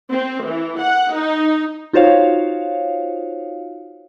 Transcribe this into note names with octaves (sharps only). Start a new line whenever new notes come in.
C4
E3
F#5
D#4
D#4 F4 F#4 C5 C#5 F5